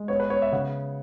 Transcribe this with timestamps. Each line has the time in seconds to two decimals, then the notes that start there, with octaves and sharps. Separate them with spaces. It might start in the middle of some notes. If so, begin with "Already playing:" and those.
Already playing: G#3
0.08 B3 C#5
0.20 B4
0.30 B3 C#5
0.42 E5
0.52 C#3 F#5